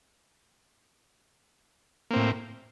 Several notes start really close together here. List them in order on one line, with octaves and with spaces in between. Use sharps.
A#3 C4 A2